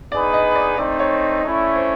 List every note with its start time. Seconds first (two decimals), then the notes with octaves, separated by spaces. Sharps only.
0.12 B3 D#4 G#4 B4 D5
0.33 D#5
0.55 D5
0.78 A3 C4 D#4 D5
0.99 C#5
1.43 A3 C#4 E4
1.76 C5